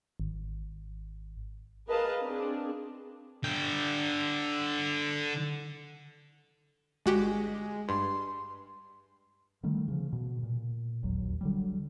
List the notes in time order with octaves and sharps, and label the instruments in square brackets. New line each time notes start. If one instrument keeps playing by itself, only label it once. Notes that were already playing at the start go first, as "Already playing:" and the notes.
[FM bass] G#1
[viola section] G#4 A#4 B4 D#5 F5 A5
C4 D4 G#4
[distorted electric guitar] D3 G5
[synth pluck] G1 F#4 G4 [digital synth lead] G#3
[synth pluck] G2 [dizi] C6
[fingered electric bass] D3 D#3 G3 A3
C#3 F3
B2
A#2
E1 A#1 D#2 F#3
D3 F#3 G3